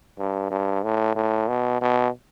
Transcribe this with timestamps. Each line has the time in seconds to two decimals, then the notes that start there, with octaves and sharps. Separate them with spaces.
0.18 G2
0.51 G2
0.83 A2
1.15 A2
1.48 B2
1.81 B2